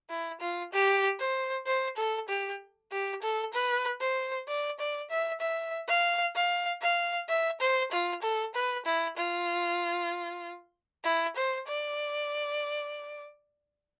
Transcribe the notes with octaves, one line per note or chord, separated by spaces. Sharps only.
E4
F4
G4
C5
C5
A4
G4
G4
A4
B4
C5
D5
D5
E5
E5
F5
F5
F5
E5
C5
F4
A4
B4
E4
F4
E4
C5
D5